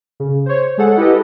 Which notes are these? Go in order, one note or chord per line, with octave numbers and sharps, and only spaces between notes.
C#3
C5 C#5
G#3 G#4 A4 F#5
E4 G4 A4 B4 D#5